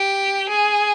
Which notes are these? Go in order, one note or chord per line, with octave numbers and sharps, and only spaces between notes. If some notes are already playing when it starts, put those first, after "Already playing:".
Already playing: G4
G#4